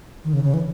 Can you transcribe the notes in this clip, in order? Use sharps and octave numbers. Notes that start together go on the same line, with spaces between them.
D#3
C#3
C#3
E3